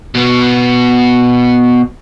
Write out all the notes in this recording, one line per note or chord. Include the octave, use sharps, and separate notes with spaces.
B2 B3